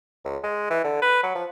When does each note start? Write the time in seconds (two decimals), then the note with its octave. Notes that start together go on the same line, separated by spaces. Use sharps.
0.25 C#2
0.43 G#3
0.70 E3
0.84 D3
1.02 B4
1.23 F#3
1.35 F3